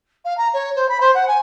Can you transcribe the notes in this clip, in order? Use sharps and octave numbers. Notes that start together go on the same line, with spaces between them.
F5
A#5
C#5
C5
B5
C5
F#5
G#5